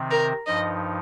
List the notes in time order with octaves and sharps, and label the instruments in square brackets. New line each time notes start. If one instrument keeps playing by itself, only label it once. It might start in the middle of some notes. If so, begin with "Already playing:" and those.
Already playing: [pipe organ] C3 D#3 C4
[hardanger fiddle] A#4
[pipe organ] G2 F3 D#4 [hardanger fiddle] D#5